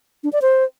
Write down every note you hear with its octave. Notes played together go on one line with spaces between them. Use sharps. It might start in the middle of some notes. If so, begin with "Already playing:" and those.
D4
D5
C5